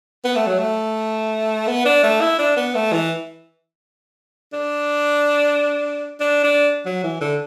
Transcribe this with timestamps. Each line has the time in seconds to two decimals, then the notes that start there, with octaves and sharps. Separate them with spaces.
0.25 B3
0.36 A3
0.47 F#3
0.59 A3
1.67 B3
1.85 D4
2.03 A3
2.21 E4
2.39 D4
2.57 B3
2.75 A3
2.93 E3
4.53 D4
6.20 D4
6.44 D4
6.86 F#3
7.03 E3
7.21 D3